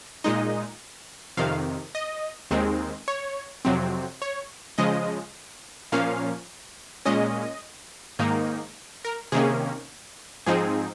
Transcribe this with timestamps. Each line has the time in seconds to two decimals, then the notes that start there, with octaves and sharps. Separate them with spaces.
0.24 A#2 G#3 D#4 D#5
1.37 F2 C3 D#3 F5
1.95 D#5
2.51 D#2 D#3 G#3 C4
3.08 C#5
3.65 F2 C3 F#3 C4
4.22 C#5
4.78 C#3 F3 G#3 D#5
5.92 A#2 F3 A#3 C#4 F5
7.05 A#2 G#3 C#4 D#5
8.19 G#2 D#3 A#3 D#4
9.05 A#4
9.32 C3 D#3 A#3 C#4 G#4
10.46 G#2 F3 C4 D#4 G#4